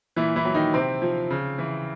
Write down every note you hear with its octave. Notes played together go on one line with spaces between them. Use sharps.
A#2 E3 E4
E3 E4
F#3
D#3 D#4
C3 C4
F3
C#3
E3